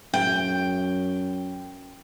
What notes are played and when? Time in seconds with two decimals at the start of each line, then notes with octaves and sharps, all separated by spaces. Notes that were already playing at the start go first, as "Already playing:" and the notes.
0.14 F#2 G5